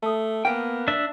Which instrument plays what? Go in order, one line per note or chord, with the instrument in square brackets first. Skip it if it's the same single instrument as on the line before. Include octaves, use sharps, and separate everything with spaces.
[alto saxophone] A3 [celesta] A5 D#6
[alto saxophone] A#3 [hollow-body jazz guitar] B3 G5
[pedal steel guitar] D4 E5